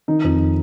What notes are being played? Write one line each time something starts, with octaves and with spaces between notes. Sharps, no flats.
D#3 D#4
F2